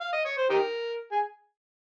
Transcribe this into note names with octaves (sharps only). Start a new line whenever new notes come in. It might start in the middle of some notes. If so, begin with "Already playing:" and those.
F5
D#5
C#5
C5
D#4 G4 A#4
G#4